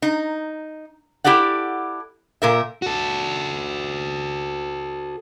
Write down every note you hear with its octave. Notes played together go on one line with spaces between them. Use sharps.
D#4
E4 G4 A4 D5 F#5
A#2 A#4 E5
F#4 A4